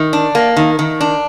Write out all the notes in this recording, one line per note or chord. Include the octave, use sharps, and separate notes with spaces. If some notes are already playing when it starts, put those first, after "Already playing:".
Already playing: D#3
D4
A#3
D#3
D#3
D4